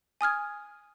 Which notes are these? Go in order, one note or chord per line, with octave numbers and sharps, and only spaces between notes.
G#5 D#6 F6 G#6